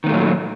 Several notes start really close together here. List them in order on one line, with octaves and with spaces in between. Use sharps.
D#3 B3 A3 A#2 F#3